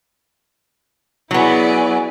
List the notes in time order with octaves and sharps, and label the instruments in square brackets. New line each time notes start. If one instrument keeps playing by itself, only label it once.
[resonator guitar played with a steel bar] F#3 B3 [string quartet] E4 G#4 D5